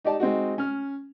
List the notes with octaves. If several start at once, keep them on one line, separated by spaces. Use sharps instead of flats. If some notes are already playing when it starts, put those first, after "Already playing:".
D#4 G4 D5 A5
G#3 C4 D#4 F#4
C#4 F6